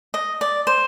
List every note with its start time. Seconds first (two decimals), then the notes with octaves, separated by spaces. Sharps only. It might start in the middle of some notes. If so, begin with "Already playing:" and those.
0.14 D#5
0.41 D5
0.67 C5